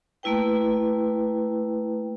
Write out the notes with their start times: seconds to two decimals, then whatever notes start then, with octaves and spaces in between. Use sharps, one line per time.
0.23 A3 A#3 E4 B4 G5